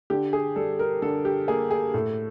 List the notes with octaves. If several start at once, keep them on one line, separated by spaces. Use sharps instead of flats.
D3 G4
G#4
G3 A4
A#4
D3 A4
G4
A#3 G#4
G#4
A2 A4